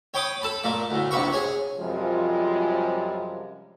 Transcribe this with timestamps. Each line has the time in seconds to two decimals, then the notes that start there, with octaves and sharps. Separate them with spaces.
0.14 C#5 G5 B5 D6 D#6
0.42 A4 A5 B5
0.63 A#2 A3 D6
0.90 D2 A2
1.11 A#1 C3 B4 B5 C#6
1.33 G#4 C#5
1.79 F#2 C3 F3 G3 G#3 F4